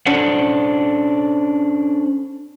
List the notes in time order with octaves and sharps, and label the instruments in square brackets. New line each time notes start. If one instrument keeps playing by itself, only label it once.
[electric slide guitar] C#4 D4 A4 C5 F#5